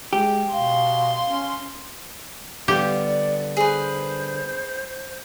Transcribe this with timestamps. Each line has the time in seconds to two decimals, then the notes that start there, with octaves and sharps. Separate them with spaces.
0.13 G#3 G4
0.52 B2 F5 C6
1.24 C#4
2.68 D3 G3 B3 G4 F5
3.01 D5
3.57 G#4 B4 C5